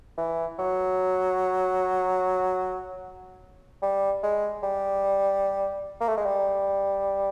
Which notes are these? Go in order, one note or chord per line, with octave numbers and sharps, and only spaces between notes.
E3
F#3
G3
G#3
G3
A#3
A3
G#3
G3